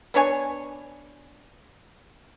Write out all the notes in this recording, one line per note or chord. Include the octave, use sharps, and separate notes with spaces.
B3 D4 C#5 G#5